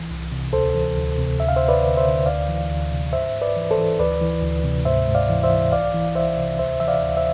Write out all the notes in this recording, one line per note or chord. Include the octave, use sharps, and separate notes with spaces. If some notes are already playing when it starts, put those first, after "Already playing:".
Already playing: C2 E3
C2
C3
D2 A4 C5
E3
D2
C3
D2 E5
F5
D2 C5 E5
B4 D5
D3
C5 E5
D3
D2 D5 F5
E3
D2
C3
G#2 C5 E5
G#2
B4 D5
E3
A4 C5
E3
D2 B4 D5
E3
D2
C3
G#2 C5 E5
G#2
D5 F5
E3
C5 E5
E3
C2 D5 F5
E3
C2 C5 E5
C3
D2 C5 E5
E3 E5
D5 F5
D2
C5 E5